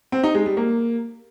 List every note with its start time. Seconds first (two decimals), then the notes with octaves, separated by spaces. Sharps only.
0.12 C4
0.24 D#4
0.35 G#3
0.46 G3
0.57 A#3